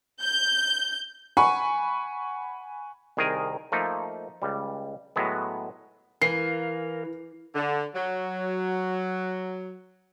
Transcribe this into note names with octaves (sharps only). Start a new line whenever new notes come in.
G6
F#5 G#5 B5 C#6
C2 D#3 G#4 A#4 G#5
F3 A3 A#3 D#4
C#2 G3
A2 F#3 G#3 B3
E3 A#4 F5 C7
D3
F#3